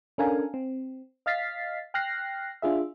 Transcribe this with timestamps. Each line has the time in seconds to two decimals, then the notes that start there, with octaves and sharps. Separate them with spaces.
0.18 C#4 D4 A4 A#4 F5 G#5
0.54 C4
1.26 D#5 F5 F6 A6 B6 C7
1.94 G5 F6 F#6 A#6 C7
2.62 D4 F4 G#4 E5